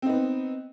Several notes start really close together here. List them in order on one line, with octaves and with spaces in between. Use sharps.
C4 D#4 B3